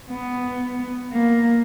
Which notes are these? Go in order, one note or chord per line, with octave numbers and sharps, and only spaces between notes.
B3
A#3